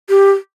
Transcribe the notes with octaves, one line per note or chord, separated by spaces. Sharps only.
G4